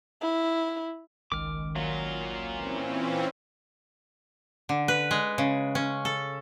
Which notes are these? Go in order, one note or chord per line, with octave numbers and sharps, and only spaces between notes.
E4
G#1 C#2 D#3 D6 F6
A#2 F#3 F4
E3 C4 C#4
D3
B4
G#3
C#3
C#4
A4